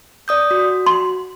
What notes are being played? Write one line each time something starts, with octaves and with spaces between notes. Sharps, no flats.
D5 D#6 G6
F#4
C6